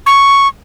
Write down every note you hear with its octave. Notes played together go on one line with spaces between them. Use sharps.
C#6